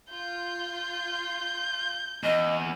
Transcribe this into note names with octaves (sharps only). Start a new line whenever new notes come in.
F4 G6
E2 D#5